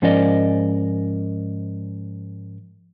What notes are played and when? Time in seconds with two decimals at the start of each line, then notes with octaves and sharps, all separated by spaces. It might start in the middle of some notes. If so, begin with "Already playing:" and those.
0.02 G#2 F3 C#4 A#4 D5 D#5